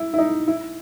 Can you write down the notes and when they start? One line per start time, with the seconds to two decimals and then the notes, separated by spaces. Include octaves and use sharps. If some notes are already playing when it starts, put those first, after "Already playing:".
Already playing: E4
0.14 E4
0.18 D#4
0.48 E4